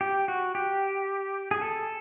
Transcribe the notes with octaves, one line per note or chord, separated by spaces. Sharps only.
G4
F#4
G4
G#4
A4